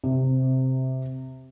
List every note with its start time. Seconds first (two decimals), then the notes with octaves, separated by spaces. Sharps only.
0.04 C3